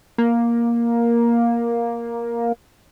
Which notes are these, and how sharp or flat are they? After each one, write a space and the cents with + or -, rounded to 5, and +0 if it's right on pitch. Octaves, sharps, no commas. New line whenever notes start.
A#3 +10